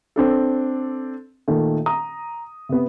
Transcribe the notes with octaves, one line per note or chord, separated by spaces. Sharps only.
C4 D4 A4
A#2 D#3 A3
A#5 D#6
C3 B3